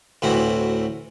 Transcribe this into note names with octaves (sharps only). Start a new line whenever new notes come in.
D2 A2 E3 C4 F#4